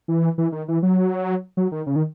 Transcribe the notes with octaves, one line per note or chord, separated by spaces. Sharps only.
E3
E3
D#3
E3
F#3
F#3
D#3
C#3
D#3